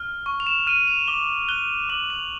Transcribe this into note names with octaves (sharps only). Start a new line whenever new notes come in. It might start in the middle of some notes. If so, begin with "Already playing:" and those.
Already playing: F6
C#6
F7
E7
F6 D#7
F7
D6 G7
F#6 G7
D6 F#7
F7